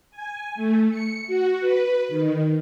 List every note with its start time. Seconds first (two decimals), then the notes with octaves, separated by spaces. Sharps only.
0.11 G#5
0.55 A3
0.90 C#7
1.27 F#4
1.59 B4
2.09 D#3